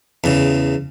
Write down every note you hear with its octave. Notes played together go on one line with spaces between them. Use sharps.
E2 C#3